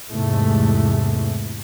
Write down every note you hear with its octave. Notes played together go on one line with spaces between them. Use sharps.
E2 G#2 C3 E3 G#3 A3